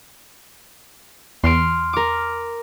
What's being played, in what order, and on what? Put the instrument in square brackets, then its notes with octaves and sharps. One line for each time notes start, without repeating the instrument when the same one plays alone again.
[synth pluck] E2 [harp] C6 F6 D7
[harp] A#4 D6